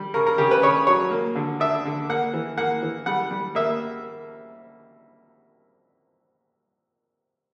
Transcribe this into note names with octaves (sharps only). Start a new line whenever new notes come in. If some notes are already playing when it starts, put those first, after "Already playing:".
Already playing: G3
C#3 A#4
A#4
C#3 G4
B4
C#3 C#5
F#3 C#5
A#3
D3
D4 E5
D3
A#3 F#5
E3
A#3 F#5
E3
G3 F#5
G3
A#3 E5